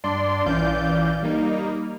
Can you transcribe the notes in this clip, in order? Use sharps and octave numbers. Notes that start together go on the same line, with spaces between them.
G2 D4 D5 C6
A#1 E3 C#4 D5 F5 G6
G3 A#3 D#4